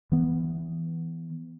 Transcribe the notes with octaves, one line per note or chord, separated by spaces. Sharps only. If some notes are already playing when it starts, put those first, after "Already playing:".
E3 B3